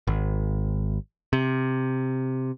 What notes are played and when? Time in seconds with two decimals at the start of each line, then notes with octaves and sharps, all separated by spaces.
0.07 G#1
1.33 C3